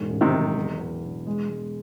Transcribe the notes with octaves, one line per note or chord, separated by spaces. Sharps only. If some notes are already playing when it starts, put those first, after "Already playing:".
Already playing: E1 G#2
A1
C3 D#3
F#3
E2
E2
E1
G#3
G#3